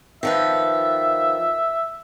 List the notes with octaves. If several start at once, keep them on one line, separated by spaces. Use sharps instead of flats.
D#3 F3 B4 E5